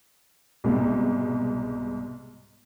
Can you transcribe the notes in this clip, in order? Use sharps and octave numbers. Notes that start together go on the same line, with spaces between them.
C2 G#2 B2